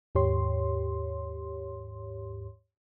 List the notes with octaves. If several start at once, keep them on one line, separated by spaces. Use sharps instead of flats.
D#2 G#2 G4 C#5 C6